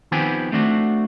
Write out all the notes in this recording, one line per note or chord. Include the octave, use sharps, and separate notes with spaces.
D#3 F3 B3 C4 G4 G#5
A3 C4 D4 F#4